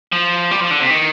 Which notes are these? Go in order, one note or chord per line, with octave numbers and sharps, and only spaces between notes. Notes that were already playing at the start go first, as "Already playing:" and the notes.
F3
G3
F3
D3
C3
D#3